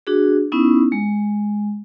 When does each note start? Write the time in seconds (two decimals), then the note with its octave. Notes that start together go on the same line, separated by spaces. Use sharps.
0.07 D4 F#4 G#4
0.52 B3 C#4 D#4 E4
0.92 G#3